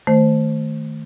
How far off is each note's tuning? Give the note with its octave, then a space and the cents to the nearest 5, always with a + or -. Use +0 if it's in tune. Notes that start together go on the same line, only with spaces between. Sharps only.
D#3 +5 A3 +0 C5 +0